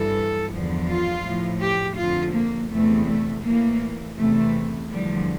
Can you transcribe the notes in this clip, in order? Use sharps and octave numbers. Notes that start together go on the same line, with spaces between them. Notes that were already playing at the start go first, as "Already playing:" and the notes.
Already playing: G2 E3 A4
E2 D3 F3
F4
A2 F3
G4
F2 D3 F3 F4
A#3
E2 C3 E3 A3
A3
A2 E3 A#3
E2 C3 E3 A3
E2 D3 F3 G3